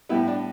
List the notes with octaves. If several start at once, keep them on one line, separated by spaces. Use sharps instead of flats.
A2 G3 B3 E4
D4